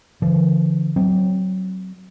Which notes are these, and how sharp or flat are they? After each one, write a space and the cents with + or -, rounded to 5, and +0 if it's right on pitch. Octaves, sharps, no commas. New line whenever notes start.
D3 +0 F3 -45
F#3 +20 C4 +0